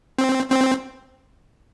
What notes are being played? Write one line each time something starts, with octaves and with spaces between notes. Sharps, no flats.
C4
C4